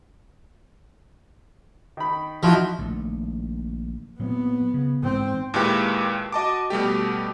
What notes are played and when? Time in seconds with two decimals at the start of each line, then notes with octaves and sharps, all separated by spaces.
1.97 D#3 B5
2.43 F3 D#4 E4 F#4
2.79 A#1 D#3 A3
4.19 A#2 F#3 B3 C4
4.74 C#3
5.03 G#2 E3 C4
5.54 D#2 A#2 G#3 E4 G4 B4
6.32 F#4 D#5 A5 D6
6.70 B2 G3 A3 G4